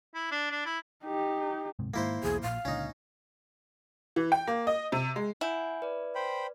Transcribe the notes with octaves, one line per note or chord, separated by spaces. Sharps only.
E4
D4
D4
E4
D#4 G4
D1 G#2 C3
G#2 D#3 G#3 A#3 E4 C5
B1 E2 B2 G#4
A#1 A#2 F5
C#2 A#2 D3 C#4 D#4
E3
G5
A#3
D#5
C3
G#3
E4 F#5 G#5 G6
B4 D5
C5 G5 B5